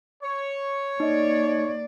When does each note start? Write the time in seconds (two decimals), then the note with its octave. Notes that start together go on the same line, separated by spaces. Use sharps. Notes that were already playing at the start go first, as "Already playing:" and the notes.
0.22 C#5
1.00 A#3 D#4 D5 D#5